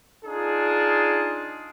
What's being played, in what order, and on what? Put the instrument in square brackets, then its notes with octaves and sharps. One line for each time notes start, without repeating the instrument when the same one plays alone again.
[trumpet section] D4 D#4 F4 G#4